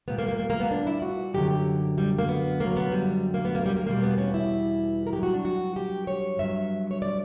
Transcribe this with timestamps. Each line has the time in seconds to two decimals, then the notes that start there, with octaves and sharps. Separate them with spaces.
0.08 A#2 G3 B3
0.18 A#3
0.29 A#3
0.40 A#3
0.50 A#3
0.60 B3
0.71 D4
0.87 E4
1.02 F#4
1.34 F#2 D3 F#3 G4
1.50 G4
1.98 G3
2.19 A#3
2.29 B3
2.60 F#2 D3 F#3 A#3
2.77 B3
2.92 G3
3.34 A#3
3.45 B3
3.55 A#3
3.66 G3
3.76 A#3
3.86 E2 B2 G3 A#3
4.02 B3
4.18 C#4
4.34 E4
5.07 A#4
5.13 G2 F#3 G4
5.23 F#4
5.34 D4
5.45 F#4
5.76 G4
6.07 C#5
6.39 G2 F#3 E5
6.91 C#5
7.02 D5